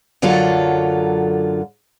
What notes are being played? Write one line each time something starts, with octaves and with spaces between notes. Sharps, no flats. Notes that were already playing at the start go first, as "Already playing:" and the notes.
F#2 D3 F#3 F4 A4